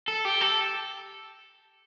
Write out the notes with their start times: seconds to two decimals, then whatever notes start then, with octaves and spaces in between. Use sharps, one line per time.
0.08 A4
0.25 G4
0.41 A4